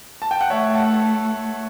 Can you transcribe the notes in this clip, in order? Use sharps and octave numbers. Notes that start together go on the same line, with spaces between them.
A5
G5
F#5
A3 C#5 E5
F#5 A5